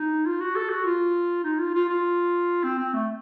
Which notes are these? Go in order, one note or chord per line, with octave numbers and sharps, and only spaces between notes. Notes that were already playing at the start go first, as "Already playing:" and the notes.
Already playing: D#4
F4
F#4
A4
F#4
F4
D#4
F4
F4
F4
C4
C4
A3